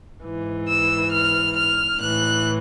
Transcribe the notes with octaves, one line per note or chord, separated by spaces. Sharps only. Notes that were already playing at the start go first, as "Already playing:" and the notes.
G#2 E3
E6
F6
F6
A2 E3 F#6